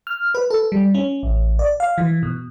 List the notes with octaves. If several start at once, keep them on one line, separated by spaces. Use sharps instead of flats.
F6
B4
A4
G3
C#4
A1
D5
F5
E3
B2